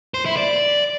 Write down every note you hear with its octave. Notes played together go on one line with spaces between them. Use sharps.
C5
E4
D5